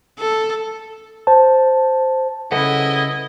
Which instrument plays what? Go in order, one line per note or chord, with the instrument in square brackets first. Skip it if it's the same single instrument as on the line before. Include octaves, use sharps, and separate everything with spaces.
[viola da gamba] A4
[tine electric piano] C5 A5
[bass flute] C#3 [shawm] E4 [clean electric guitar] A4 B4 F#5 [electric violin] D#5